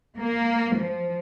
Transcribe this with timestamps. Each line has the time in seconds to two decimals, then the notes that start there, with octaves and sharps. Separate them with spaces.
0.19 A#3
0.76 F3